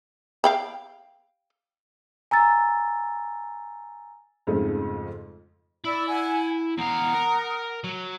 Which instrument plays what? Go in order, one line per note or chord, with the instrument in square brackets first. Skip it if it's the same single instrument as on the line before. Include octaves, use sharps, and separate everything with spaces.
[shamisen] F5 G5 B5
[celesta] G#5 A#5 E6 A6
[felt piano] F2 G#2 C#3 F3 G#3 A3
[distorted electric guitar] E4 [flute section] D5 B5 E6
[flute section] F#5 G#5
[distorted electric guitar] E2 F5 [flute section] F#5 A#5 D#6
[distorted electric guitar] A#4
F#3